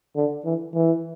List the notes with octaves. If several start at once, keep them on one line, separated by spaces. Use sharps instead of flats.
D3
E3
E3